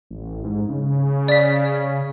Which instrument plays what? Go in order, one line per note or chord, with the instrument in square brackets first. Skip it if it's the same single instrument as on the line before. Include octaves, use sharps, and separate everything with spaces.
[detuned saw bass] A1
G#2
C#3
[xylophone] D5 B6